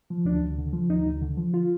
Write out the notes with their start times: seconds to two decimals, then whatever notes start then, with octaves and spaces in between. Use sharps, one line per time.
0.10 F3
0.25 D2 D4
0.42 D2
0.58 D3
0.73 F3
0.90 D2 D#4
1.05 D2
1.21 D3
1.37 F3
1.54 F4